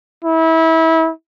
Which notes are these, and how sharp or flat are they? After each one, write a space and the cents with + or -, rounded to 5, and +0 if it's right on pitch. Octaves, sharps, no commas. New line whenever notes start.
E4 -25